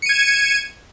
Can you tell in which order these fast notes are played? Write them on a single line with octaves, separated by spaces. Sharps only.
C#7 D#7 G#6 E7